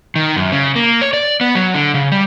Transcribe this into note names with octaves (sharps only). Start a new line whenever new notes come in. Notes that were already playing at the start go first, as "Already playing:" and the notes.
D#3
F#2
C#3
A#3
C#5
D5
B3
F#3
D3
C#3
G3